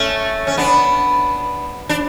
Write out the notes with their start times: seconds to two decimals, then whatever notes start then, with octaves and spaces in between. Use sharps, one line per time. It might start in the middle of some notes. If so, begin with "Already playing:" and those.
Already playing: A3 C#4
0.47 C#4
0.57 B3 D4
1.89 D4